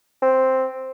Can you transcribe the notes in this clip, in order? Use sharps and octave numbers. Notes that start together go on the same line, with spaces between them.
C4